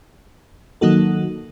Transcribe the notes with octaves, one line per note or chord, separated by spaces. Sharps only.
D#3 F#3 A#3 D#4 F#4 A4